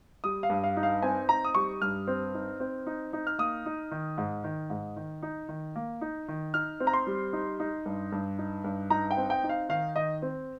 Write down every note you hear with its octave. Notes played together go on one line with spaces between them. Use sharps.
G3 D#6
F5
G2
F5
D#4
F5
C4 G#5
D#4 A#5
D#6
G3 C#6
G2 F6
C4
D#4
C4
D#4
D#4
F6
A#3 D#6
D#4
D#3
G#2
D#3
G#2
D#3
D#4
D#3
A#3
D#4
D#3
D#4 F6
C4
A#5
C6
G3
D#4
D#4
G2
G2
D#4
G2
D#4 A#5
G5
C4
G5
D#4
F5
D#3 F5
D#3 D#5
C4